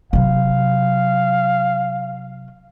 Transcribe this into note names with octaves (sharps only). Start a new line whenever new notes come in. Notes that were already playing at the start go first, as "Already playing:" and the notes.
C3 F#3 F5